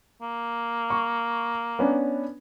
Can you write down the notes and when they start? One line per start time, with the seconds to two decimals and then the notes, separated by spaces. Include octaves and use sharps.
0.22 A#3
0.90 C#6
1.79 B3 C#4 D4